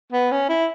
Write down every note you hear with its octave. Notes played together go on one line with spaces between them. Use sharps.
B3
C#4
E4